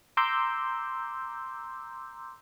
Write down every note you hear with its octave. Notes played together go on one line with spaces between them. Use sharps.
A#5 C6 D6 E6 G6